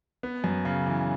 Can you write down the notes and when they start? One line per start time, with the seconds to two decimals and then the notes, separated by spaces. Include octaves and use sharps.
0.23 B3
0.44 F#2
0.65 C#3
0.86 E3